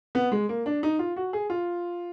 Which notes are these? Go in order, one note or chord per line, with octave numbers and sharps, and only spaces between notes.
B3
G#3
A#3
D4
D#4
F4
F#4
G#4
F4